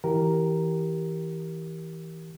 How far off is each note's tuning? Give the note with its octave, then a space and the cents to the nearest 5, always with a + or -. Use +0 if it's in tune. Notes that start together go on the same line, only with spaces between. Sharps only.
E3 -20 G4 -10 A#4 +0